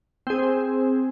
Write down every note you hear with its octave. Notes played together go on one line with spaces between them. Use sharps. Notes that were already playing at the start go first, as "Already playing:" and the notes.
C4 G#4